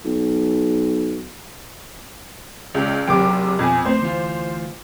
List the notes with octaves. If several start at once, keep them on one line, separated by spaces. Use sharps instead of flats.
B1
C#2 C#4 D5
F#1 C3 F#3 G5 D6
F2 B2 C4 G#5
A3 C4 C5
D2 E3 F4